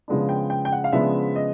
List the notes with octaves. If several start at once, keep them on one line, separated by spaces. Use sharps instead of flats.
C#3 F3 G#3 B3 D4
G5
G5
G5
F#5
F5
C#3 F3 G#3 B3 D4 E5
D#5